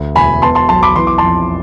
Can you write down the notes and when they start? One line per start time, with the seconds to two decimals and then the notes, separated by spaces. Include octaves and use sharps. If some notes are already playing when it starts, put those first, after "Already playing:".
Already playing: D2
0.15 E1 G#5 B5
0.42 B2 A5 C6
0.55 A5 C6
0.69 B1 A5 C6
0.83 B5 D6
0.96 E3 C6
1.07 D6
1.18 F2 A5 C6